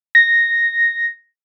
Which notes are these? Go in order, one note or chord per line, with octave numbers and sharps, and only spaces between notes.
A#6